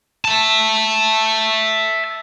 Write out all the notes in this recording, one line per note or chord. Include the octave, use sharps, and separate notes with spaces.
E5 A5